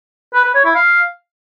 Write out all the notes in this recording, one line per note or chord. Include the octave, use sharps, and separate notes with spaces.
B4
B4
C#5
E4
F5